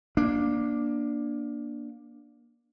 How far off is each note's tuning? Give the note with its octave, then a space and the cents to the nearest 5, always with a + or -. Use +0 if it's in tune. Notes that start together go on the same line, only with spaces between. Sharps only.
A#3 +25 D4 +0